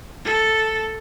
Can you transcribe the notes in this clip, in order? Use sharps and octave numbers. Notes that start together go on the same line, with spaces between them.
A4